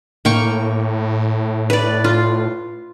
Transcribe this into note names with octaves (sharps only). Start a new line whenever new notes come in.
A2 A#3 G5 C#6
B4 D5
F4